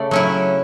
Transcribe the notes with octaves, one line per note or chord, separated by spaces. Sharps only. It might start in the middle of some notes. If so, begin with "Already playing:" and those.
Already playing: C#3 A3 D5
F#3 C#4 E4